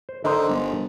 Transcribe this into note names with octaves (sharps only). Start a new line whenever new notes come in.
C5
D3 D#4 A#4 C5
G1